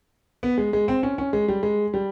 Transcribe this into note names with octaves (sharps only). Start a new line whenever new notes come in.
B3
G#3
G#3
C4
C#4
C#4
G#3
G3
G#3
G3